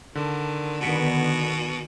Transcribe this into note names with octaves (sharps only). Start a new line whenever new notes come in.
D3 D#3
B2 D3 D#3 B3 B6 C#7 D7